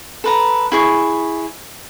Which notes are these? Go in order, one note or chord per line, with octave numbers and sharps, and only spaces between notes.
A4 B4 A#5
E4 G#4 C#6